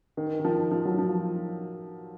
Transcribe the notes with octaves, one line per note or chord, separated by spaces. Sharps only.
D#3
D#3
F3
F3
F#3
F3